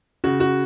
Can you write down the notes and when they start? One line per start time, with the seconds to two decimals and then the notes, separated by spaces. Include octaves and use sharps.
0.24 C#3 F#4
0.40 F#4